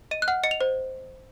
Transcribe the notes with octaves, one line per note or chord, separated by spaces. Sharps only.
D#5 D#7
F#6
F#5 F6
D#5 C#7
F7
C5